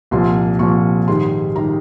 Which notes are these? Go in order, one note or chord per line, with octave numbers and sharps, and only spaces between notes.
C2 A#2 F3 C6
C2 A#2 F3 C#6
G#2 D#3 G3 C6
D#3 G3 A#5